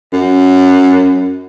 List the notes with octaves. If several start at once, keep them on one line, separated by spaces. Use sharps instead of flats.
F#2